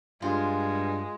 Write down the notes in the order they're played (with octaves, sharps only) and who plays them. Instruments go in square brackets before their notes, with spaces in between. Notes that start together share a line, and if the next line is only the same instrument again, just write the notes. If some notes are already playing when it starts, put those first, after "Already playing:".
[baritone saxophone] G2 [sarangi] G#3 [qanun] F4